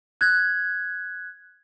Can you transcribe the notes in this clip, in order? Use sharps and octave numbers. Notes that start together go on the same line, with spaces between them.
F#6 G#6